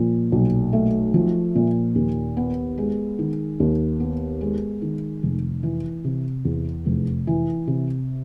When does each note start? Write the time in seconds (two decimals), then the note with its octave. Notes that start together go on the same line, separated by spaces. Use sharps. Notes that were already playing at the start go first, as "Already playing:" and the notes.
Already playing: A#2 F3
0.32 B1
0.73 A3
1.14 F3
1.55 A#2
1.95 D#2
2.37 B3
2.78 G#3
3.19 D#3
3.60 D#2
4.00 B3
4.41 G#3
4.82 D#3
5.23 F1
5.63 E3
6.05 C3
6.45 E2
6.86 F1
7.27 E3
7.67 C3